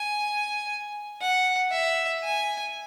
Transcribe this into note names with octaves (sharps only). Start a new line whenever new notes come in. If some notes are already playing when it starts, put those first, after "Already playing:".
Already playing: G#5
F#5
E5
G#5